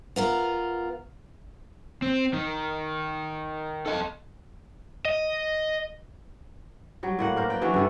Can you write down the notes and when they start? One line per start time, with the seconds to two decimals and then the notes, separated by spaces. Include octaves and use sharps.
0.16 B3 F4 A#4
2.02 C4
2.34 D#3
3.86 A4 D#5
5.05 D#5
7.03 F#3 G3
7.19 A2 A#3 F#5
7.36 D4 A#4 C5
7.50 B4 D5 G5
7.62 E3 F#3 D4 F#4
7.74 G2 D3 A3